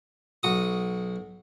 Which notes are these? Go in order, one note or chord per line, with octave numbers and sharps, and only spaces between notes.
B1 F#4 D#6